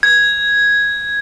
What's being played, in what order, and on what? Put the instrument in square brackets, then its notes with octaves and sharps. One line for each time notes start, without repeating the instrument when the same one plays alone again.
[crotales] G#6